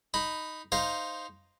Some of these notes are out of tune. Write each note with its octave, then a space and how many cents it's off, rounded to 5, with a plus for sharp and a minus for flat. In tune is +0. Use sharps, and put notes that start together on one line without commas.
D#4 +0 B5 +10
D#4 +0 C5 +0 F5 -5